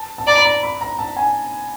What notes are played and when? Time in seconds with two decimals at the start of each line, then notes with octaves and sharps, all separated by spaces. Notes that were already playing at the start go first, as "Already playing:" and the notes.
Already playing: A5
0.18 A5
0.27 D5 A#5
0.38 B5
0.45 A#5
0.63 B5
0.81 A#5
0.99 A5
1.17 G#5